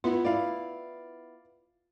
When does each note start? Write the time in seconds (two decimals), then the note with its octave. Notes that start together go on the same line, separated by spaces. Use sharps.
0.04 B3 E4 F4
0.24 B3 E4 D5 F5